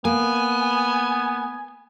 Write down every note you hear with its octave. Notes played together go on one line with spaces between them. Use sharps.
A#3 B3 G#5